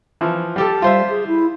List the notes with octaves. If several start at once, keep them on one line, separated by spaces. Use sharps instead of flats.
E3 F3
G3 G4 A4
G3 F4 C5 E5
G#4
E4